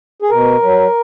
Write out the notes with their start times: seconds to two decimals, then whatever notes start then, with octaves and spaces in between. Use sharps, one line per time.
0.22 G#4
0.30 B2 A#4
0.62 F#3